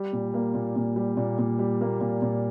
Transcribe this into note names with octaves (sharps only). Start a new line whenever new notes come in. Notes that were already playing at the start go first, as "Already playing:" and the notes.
Already playing: G3
A#2
A#3
A#2
A#2
G3
A#2
A#2
G3
A#3
A#2
A#2